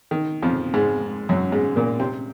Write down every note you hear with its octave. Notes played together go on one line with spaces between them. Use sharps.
D#3
F2 F3
G#2 G#3
F#2 F#3
G#2 G#3
A#2 A#3
C3 C4